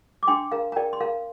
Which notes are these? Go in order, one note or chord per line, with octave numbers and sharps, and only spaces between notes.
D6
D4 G5 C6
A#4 F5 A#5
A#5
A#4 D5 G5
C6
A#4 F5 A#5